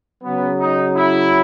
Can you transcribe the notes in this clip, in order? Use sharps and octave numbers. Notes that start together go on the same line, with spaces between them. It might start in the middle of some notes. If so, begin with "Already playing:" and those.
C#3 F#3 B3
D#4
E4